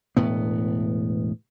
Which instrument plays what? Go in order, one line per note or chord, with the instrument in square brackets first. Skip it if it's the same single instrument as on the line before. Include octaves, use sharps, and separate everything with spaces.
[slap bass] E1 A2 B3